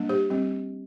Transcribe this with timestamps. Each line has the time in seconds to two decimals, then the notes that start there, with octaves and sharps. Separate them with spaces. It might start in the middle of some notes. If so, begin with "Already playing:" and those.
Already playing: G3 A#3 D4
0.09 G4 C5
0.30 G3 C4